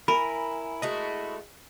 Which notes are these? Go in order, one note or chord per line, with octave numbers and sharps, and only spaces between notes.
E4 A#4 G#5 B5
G#3 A3 E4 F#4 D#5